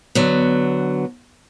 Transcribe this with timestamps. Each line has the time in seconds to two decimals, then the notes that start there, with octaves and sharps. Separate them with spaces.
0.15 D3 F#3 B3